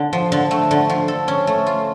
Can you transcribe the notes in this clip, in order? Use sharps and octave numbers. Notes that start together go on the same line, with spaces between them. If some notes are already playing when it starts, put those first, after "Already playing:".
Already playing: D3
F3
D3
A3
D3
F3
A4
C#4
A3
F4